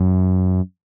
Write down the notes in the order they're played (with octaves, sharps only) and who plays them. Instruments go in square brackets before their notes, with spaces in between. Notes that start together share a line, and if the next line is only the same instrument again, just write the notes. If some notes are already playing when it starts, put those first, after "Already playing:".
Already playing: [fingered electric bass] F#2